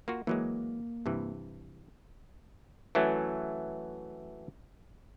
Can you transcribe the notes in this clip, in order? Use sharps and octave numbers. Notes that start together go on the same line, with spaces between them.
A#3 F4 F#4
E3 F#3 G#3 A#3
G2 C3 E3
E3 F#3 A3 C#4